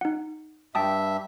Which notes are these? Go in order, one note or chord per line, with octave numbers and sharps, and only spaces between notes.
D#4 F#5
G2 E5 G5 A5 D#6